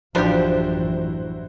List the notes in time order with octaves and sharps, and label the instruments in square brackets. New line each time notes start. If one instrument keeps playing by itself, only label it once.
[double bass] A1 F#2 [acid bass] F3 [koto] D4 G4 [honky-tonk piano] E4 F#4 C5